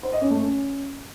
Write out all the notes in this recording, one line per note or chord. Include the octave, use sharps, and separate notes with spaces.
C5
D#5
C#4
A3
C#4